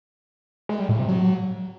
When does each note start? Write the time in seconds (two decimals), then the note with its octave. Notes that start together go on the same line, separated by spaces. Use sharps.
0.69 G#3
0.79 G3
0.89 A2
0.98 C3
1.08 F#3